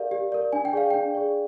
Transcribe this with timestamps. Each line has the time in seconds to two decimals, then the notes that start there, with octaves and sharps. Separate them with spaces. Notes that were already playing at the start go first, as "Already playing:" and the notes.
Already playing: G4 A#4 D5 F5
0.11 G4
0.32 A#4 D5
0.53 D4 G#5
0.65 G5
0.73 G#4 D5 F5
0.90 D4 G5
1.15 G#4 D5